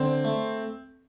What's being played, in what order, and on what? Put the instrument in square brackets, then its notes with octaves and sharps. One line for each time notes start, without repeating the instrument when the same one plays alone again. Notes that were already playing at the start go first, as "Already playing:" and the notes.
Already playing: [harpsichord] D3 [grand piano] C4
[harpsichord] A3